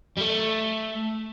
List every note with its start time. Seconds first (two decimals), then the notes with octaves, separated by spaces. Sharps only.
0.18 G3
0.21 A3